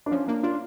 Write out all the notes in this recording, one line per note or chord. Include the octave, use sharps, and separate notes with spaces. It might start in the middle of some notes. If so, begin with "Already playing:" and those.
D4
F3 C#4
A#3 D4
D4 F4